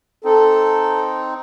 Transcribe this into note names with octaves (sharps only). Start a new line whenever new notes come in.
C4 D#4 A4